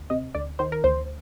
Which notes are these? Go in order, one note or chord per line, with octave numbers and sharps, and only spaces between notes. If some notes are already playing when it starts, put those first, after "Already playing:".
Already playing: D2
C3 D#5
D2 D5
D#3 C5
A#4
D2 C5